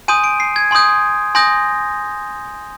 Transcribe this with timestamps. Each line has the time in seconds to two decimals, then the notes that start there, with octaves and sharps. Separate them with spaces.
0.08 G#5 C6 D#6 G6 D#7
0.24 D7
0.40 C7
0.56 G#6
0.71 G#5 C6 D#6 G6
1.35 G#5 C6 D#6 G6 A#6